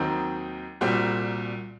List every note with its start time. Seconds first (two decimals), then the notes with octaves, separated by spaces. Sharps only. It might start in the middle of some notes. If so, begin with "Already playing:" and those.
Already playing: D#2 D#3 F#3 C4 D#4
0.81 C2 A#2 G3 C4 F#4